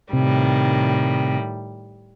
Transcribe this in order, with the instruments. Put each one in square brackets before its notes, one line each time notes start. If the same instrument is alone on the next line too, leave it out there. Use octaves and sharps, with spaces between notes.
[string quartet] A2 D#3 G3 [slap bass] C3